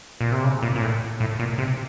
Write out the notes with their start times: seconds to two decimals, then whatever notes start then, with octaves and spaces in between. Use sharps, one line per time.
0.21 A#2
0.32 C3
0.44 C#3
0.63 A#2
0.76 A#2
0.81 A2
1.20 A2
1.39 A#2
1.58 C3